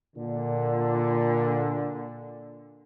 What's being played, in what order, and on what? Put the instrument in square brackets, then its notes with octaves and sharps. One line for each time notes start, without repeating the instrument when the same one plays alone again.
[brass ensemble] A#2 D3